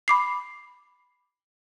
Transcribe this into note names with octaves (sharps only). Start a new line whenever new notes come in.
B5 D6 C7